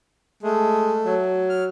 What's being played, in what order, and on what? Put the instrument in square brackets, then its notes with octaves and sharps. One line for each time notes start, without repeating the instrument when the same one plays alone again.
[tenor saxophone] G#3 [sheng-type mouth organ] A3
[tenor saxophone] F#3
[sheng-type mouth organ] F6